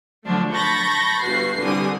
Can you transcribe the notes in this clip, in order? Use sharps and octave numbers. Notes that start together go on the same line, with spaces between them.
D3 F3 F#3 A3 D4
A5 B5 C#6 G6 A6 A#6
G1 F#4 B4 C7
C2 D3 G3 D4 G#5 D#6